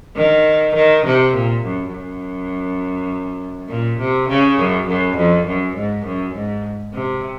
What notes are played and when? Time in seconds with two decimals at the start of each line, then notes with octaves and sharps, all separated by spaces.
0.16 D#3
0.75 D#3
1.05 C3
1.34 A#2
1.63 F#2
1.93 F#2
3.69 A#2
3.99 C3
4.29 C#3
4.58 F#2
4.87 F#2
5.16 F2
5.46 F#2
5.76 G#2
6.05 F#2
6.34 G#2
6.93 C3